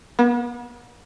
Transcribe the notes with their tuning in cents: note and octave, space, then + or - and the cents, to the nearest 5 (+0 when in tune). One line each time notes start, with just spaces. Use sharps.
B3 -40